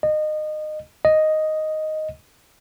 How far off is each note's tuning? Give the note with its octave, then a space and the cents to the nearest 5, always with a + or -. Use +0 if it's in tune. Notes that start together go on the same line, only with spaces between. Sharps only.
D#5 -25
D#5 +0